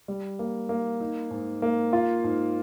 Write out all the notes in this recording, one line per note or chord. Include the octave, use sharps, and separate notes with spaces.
G3
A#3
A#3
D#4
G#2
A#3
F4
G#2